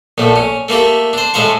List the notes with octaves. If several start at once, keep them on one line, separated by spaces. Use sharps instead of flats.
A#1 A2 A3
C#4
A3 A#3 E4 G4
D4 C5
A2 G#3 E4 C5 F5 C#6